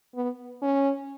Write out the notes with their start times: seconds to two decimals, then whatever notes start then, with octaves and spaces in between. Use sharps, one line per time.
0.15 B3
0.62 C#4